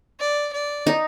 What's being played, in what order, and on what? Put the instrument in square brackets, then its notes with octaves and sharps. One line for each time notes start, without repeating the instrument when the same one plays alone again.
[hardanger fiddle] D5
D5
[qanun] D#4